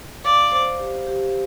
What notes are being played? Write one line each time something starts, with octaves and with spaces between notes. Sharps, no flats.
D5 F5
C5
G4
G4